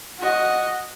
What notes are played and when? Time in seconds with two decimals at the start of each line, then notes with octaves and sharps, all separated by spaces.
0.18 F#4 D#5